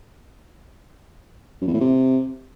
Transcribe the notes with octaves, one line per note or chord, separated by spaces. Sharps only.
F#2
E2
A2
C3